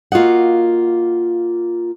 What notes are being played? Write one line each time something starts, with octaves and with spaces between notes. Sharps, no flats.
A#3 F4 F#4 D#5 F#5